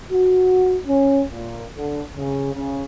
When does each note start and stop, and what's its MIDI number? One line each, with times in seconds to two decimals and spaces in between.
0.11 0.77 66
0.87 1.22 61
1.32 1.64 46
1.76 2.03 50
2.16 2.52 49
2.54 2.83 49